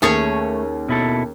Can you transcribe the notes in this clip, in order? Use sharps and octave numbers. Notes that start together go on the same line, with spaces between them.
D#2 A3 C#4 G#4 C#5
B2 E4 A4